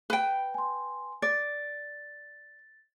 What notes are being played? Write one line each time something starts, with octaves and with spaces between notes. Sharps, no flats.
B4 G5
G#5 C6
D5 A6